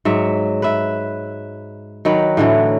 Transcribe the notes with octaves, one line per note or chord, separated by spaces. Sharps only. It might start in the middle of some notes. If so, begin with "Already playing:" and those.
G#2 F#3 E5
B4 E5
D#3 F#3 B4
A2 D3 E3 F#3